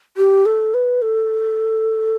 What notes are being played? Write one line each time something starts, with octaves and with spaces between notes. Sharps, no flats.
G4
A4
B4
A4